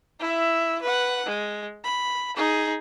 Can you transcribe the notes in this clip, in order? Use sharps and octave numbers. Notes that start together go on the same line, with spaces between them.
E4 E5
B4 F#5
G#3
B5
D#4 G#4